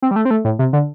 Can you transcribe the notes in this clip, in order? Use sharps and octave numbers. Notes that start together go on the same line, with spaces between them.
C4
G3
A3
C4
A3
A2
C3
D3